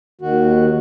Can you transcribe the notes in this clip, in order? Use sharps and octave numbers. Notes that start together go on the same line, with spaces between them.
D#2 D#3 F#4